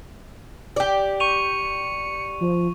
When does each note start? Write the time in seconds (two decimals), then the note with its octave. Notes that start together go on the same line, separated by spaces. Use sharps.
0.76 G4 D5
1.20 C#6 C#7 D#7 F7
2.41 F3